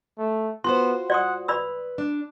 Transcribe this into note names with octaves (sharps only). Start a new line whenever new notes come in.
A3
B3 F4 F#4 C5 C6
D5 F#5 C6 D#6
B4 D5 B5 E6
D4